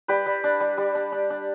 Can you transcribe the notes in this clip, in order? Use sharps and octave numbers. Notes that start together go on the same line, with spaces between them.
G3 G4 B4
G3
D4
G3
G3
D4
D4
D4